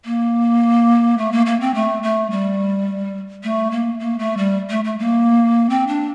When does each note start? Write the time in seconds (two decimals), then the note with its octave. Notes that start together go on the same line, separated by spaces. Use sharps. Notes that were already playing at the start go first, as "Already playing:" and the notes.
0.05 A#3
1.18 A3
1.32 A#3
1.46 A#3
1.61 C4
1.75 A3
2.03 A3
2.31 G3
3.43 A3
3.71 A#3
4.00 A#3
4.19 A3
4.37 G3
4.70 A3
4.85 A3
4.99 A#3
5.70 C4
5.87 D4